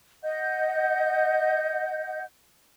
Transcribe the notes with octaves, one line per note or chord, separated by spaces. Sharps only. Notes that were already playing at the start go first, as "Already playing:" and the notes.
D#5 F#5 G6